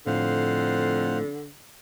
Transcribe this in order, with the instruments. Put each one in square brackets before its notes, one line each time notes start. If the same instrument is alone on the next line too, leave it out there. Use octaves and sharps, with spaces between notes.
[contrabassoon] F2 [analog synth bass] A2 [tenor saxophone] D3 [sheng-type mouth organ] C5 F5 F#5